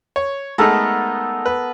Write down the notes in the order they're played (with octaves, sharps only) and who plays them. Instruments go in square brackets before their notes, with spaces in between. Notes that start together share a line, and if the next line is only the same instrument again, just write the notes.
[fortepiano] C#5
[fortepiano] G#3 A3 D#4 [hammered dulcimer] B3 A4 A#4
[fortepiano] B4